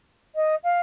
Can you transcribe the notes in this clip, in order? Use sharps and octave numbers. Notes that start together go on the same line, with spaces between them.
D#5
F5